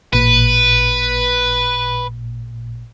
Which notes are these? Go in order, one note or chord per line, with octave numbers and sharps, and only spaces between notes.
A1 A#2 B4